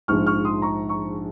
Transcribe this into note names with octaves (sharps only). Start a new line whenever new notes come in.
A#1 G#2 F3 G#3 C#6 F6
C#6 F6
C6 D#6
A#5 C#6
A#5 C#6